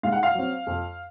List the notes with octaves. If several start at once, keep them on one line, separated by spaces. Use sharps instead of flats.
G#2 F5
F#5
F5
F#3 C4
F2